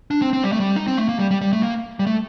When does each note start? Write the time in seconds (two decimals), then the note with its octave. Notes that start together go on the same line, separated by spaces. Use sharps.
0.11 D4
0.22 C4
0.33 C4
0.44 G3
0.52 A3
0.60 G3
0.76 D#4
0.87 C4
0.97 A3
1.09 A#3
1.19 G3
1.31 G3
1.41 G3
1.53 A3
1.63 A#3
1.99 G3
2.07 A3